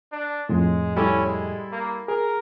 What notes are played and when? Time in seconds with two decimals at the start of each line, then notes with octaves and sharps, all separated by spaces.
0.12 D4
0.49 F2 A2 G#3
0.96 G3 C#4 E4 A4
1.26 G#3
1.72 A#3
2.08 G#4 A#4